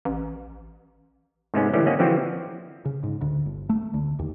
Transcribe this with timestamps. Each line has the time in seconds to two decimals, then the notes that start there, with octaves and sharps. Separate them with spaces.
0.05 A1
1.54 G#2 C3 G#3 A3 B3 C#4
1.74 D3 E3 G3 A3 C#4
1.87 A#3 C4 C#4 D#5 F#5
1.99 D3 E3 F3 C4 F#4 G4
2.85 C#3
3.03 G#2
3.21 D2
3.46 G1
3.69 A3
3.94 D2
4.19 D#2